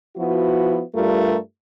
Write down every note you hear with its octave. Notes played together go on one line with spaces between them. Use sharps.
F3 B3 E4 F#4
G2 G3 A3 F4 A#4